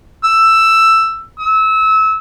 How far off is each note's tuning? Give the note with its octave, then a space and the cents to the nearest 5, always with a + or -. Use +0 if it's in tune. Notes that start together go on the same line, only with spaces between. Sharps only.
E6 +10
E6 -30